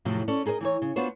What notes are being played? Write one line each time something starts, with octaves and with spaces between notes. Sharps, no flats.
F2 A2 C3 F3 F#3
C#4 A4 C#5 D5
D#4 G#4 A#4 C5 D#5
E3 D#4 C#5
C#3
B3 D4 F4 F#4 C5 C#5